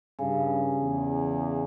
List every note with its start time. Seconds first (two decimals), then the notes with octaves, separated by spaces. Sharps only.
0.19 G2 C#3
0.82 E2